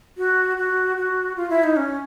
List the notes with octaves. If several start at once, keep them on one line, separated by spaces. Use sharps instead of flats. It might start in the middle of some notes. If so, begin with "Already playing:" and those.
F#4
F#4
F#4
F4
E4
D#4
C#4